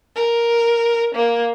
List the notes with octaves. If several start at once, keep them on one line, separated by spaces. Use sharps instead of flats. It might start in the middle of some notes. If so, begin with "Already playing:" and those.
A#4
A#3